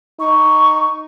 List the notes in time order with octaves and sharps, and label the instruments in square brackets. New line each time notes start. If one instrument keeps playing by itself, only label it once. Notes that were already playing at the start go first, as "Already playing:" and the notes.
[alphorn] D#4 [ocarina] C#6